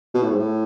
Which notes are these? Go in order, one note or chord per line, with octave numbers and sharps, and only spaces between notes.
B2
A2
G#2
A2